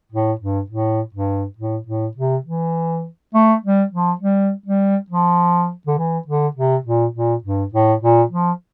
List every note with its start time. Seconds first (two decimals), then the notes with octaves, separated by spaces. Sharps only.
0.12 A2
0.41 G2
0.70 A2
1.14 G2
1.58 A2
1.87 A2
2.16 C3
2.46 E3
3.34 A3
3.63 G3
3.92 F3
4.21 G3
4.66 G3
5.10 F3
5.87 D3
5.98 E3
6.27 D3
6.56 C3
6.85 A#2
7.14 A#2
7.44 G2
7.73 A2
8.02 A#2
8.31 F3